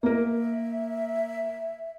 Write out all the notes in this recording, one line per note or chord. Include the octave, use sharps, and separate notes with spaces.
A#3 A#4 E5